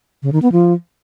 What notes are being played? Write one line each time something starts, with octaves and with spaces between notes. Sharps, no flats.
C#3
D#3
B3
F3